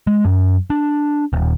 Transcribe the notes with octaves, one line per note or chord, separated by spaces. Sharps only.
G#3
F#2
D4
D#1